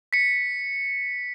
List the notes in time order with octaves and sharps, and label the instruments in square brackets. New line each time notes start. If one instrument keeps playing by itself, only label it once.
[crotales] B6 C#7